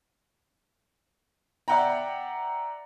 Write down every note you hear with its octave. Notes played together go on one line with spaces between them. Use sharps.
D5 E5 F#5 G5 A#5